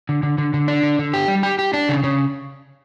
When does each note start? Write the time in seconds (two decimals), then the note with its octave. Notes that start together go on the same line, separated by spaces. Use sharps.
0.09 D3
0.23 D3
0.38 D3
0.54 D3
0.68 D4
0.83 D3
0.99 D3
1.14 G4
1.28 G3
1.43 G4
1.59 G4
1.73 D4
1.89 C#3
2.03 C#3